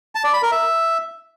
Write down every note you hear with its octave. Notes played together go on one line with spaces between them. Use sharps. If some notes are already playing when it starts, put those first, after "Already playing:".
A5
D5
B5
A#4
E5